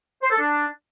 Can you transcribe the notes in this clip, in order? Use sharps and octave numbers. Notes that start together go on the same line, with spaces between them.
C5
A4
D4